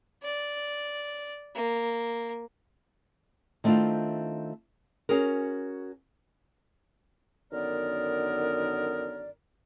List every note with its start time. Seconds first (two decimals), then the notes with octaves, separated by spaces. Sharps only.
0.23 D5
1.55 A#3
3.64 D#3 A3 C4 D4 E4 F4
5.09 C#4 F#4 G#4 A#4
7.52 F#2 D3 D#3 B3 A#4 D5